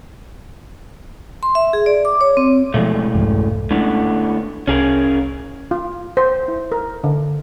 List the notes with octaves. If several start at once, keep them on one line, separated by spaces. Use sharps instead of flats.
C6
E5
G#4
D5
D6
C#5
C4
B2 E3 F3 G#3 A3
C2 F2 G#2
A2 D3 G#3 B3 C#4
C2 C#4 G#4 A#4
F4
C5
E4
A#4
D3